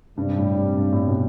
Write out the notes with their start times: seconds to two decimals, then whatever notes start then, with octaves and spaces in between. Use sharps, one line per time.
0.17 G2 C3 G3 D4
0.38 A2
0.57 A2
0.77 G2
0.92 A2
1.07 B2